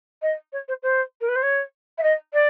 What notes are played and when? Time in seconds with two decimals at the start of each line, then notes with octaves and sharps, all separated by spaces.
0.22 D#5
0.52 C#5
0.68 C5
0.83 C5
1.21 A#4
1.28 B4
1.35 C5
1.42 C#5
1.98 E5
2.03 D#5
2.33 D5